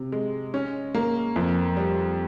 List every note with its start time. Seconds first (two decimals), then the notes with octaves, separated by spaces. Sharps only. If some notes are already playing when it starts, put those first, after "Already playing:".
Already playing: C3
0.12 G#3
0.54 C#4
0.95 A#3
1.36 F2
1.77 G3